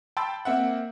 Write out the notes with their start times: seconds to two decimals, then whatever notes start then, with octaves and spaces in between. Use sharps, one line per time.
0.17 G5 A5 B5 C6 E6 A6
0.45 A#3 C4 E5 F#5